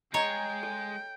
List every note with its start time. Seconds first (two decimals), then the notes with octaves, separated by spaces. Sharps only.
0.14 G#3 C#5 D#5 G5 G#5 A#5
0.63 A4